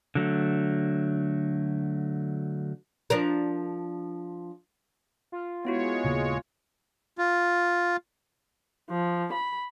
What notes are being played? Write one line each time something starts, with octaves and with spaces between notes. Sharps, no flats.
D3 F#3 A3
F3 D4 A#4
F4
G#3 B3 E4 F#4 C#5
D#1 C#3 A#3
F4
F3
B5